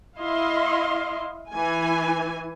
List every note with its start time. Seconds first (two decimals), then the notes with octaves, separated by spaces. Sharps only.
0.18 E4 D#5 F5 C6
1.51 E3 G#5